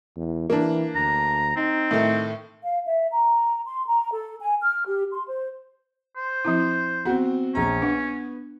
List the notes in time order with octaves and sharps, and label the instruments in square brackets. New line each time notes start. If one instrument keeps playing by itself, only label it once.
[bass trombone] E2
[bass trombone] E3 [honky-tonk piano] A#3 D4
[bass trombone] D2 [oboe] A#5
[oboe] C4 [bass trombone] D#4
[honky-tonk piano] A2 D#3 A3
[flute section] F5
E5
A#5
C6
A#5
A4
G#5
F6
G4
C6
C5
[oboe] C5
[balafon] F3 C4 E4
[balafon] B3 [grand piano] C4 F#4
[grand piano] A#1 A#5 [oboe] C#4
[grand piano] B3 [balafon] D4